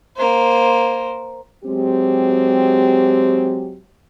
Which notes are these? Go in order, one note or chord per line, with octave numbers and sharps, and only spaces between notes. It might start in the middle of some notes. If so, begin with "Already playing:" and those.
A#3 C5
F#3 G#3 C4 G4